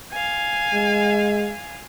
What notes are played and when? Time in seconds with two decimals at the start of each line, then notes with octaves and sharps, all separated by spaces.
0.12 F5 G#5
0.74 G#3